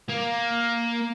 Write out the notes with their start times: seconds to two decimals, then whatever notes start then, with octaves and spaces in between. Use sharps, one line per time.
0.09 A#3